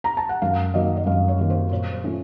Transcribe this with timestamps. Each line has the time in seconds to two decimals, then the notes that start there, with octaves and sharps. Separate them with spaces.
0.04 A#5
0.17 A5
0.29 F#5
0.42 F#2 F5
0.74 D#3 F#3 A#3 D#5
0.97 D#5
1.06 F#2 F5
1.28 C#5
1.39 D#3 F#3 A#3
1.50 C5
1.71 A#2 C#5
1.93 C5
2.04 A3 C#4 F4